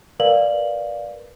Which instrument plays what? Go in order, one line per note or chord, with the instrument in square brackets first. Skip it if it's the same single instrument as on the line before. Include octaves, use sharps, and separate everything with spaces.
[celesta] A#4 B4 D5 F5 F#7